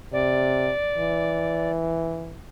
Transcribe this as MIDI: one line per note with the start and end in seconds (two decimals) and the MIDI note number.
0.13 0.70 48
0.13 1.71 74
0.97 2.37 52